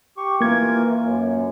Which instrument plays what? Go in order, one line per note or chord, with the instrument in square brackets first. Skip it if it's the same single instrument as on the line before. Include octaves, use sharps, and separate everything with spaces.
[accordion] G4 C#6
[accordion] E3 F4 A#4 [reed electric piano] A#3 G#6
[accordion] F#2